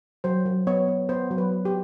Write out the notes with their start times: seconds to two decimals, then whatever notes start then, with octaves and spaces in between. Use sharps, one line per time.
0.24 F#3 C5
0.46 F#3
0.67 B3 C#5
0.88 B3
1.09 B3 C5
1.31 F#3
1.38 B4
1.51 B3
1.65 G4